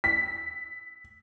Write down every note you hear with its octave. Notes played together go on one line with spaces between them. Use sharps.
B6